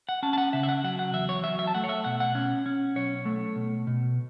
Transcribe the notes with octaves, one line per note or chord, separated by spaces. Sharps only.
F#5
C#4 A5
A5
F#5
C#3 E5
E5
F#5
F#3 F#5
F#5
E2 E5
C#5
F#3 E5
E5
A5
A3 F#5
C#5
E5
B2 F#5
F#5
C#4
C#4
B1 C#5
A3
B2
B2